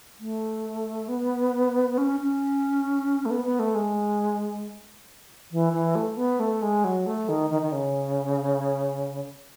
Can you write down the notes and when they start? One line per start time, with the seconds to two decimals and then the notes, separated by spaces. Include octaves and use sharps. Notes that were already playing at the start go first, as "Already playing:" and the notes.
0.20 A3
1.08 B3
1.98 C#4
2.20 C#4
3.26 A3
3.31 B3
3.45 B3
3.59 A3
3.75 G#3
5.52 E3
5.73 E3
5.95 A3
6.17 B3
6.40 A3
6.62 G#3
6.84 F#3
7.06 A3
7.29 D#3
7.50 D#3
7.62 D#3
7.72 C#3